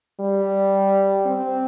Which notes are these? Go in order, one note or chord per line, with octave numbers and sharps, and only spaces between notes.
G3
C4